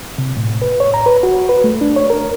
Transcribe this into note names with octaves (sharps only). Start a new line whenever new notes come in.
C3
A2
B4
C#5
A#5
B4
F#4
B4
A3
D4
C#5
A#4